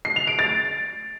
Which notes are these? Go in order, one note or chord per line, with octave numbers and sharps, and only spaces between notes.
C7
F7
D7
A6